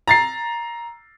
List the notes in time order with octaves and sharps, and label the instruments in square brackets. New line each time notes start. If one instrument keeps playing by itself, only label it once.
[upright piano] A#5 A6 C7